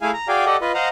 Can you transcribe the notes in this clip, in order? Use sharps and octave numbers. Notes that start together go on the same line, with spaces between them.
A3 E4 G#4 F5 G#5
A#5
F#4 G#4 D5 F5 G5 G#5
G4 A4 D5 D#5 F#5
F4 B4 D#5
C5 D#5 F5 F#5 A#5